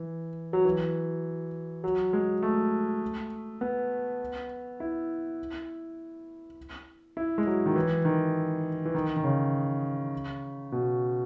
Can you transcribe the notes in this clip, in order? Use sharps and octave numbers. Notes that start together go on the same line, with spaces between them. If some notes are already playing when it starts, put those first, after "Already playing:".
Already playing: E3
F#3
E3
F#3
G#3
A3
B3
E4
E4
G#3
F#3
D#3
E3
D#3
E3
D#3
D#3
C#3
B2